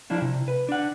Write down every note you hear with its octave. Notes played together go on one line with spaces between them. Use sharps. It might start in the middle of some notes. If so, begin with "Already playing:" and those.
F3 D4 E4 F4
C3
B4
D4 F#5